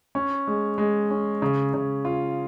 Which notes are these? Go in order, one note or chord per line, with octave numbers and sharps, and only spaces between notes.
C#4
G#3
G#3
C#4
C#3
C#3
F4